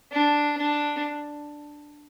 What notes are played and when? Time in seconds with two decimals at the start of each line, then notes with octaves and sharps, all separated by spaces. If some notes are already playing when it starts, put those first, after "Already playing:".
0.12 D4
0.58 D4